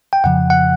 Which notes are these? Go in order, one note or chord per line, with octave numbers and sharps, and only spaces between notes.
G5
F2 C#3 F3 F#5
F#5